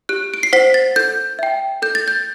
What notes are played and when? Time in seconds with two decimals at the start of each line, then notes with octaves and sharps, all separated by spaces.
0.09 G4 F#6
0.34 D7
0.43 C7
0.53 C5 F#5 B6
0.74 A6
0.96 A4 G6
1.39 E5 G5
1.82 A4 G6
1.95 A6
2.08 G6